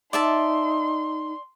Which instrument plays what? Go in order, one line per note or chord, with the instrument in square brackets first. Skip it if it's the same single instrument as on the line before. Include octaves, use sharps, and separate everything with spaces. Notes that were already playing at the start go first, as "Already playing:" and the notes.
[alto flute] D#4 [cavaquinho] D5 E5 A5 [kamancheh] C6